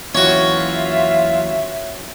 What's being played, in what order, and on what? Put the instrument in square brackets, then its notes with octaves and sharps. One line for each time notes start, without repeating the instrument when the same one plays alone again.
[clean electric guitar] D#2 E3 F#3 [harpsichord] C#4 F#4 [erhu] F4 [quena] E5